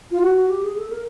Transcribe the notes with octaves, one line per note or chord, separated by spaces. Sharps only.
F4
F#4
G4
G#4
A4
A#4